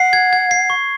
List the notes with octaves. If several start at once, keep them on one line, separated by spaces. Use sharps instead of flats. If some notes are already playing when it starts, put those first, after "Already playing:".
Already playing: F#5 C7
G#6
G#6
C7
C#6